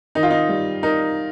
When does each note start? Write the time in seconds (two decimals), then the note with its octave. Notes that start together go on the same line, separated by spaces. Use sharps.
0.15 D#3 D#4
0.23 F4
0.31 D#4
0.49 G3
0.83 D#4 A#4